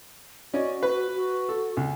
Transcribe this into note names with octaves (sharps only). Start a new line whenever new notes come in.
C#4 F#4 D5 D#5
B4
F#4
A4
C#2